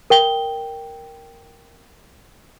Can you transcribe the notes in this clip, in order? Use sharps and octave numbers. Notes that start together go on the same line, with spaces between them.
A#4 G5 G7